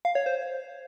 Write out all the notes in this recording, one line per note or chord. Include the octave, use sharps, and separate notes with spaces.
F5
C#5
C5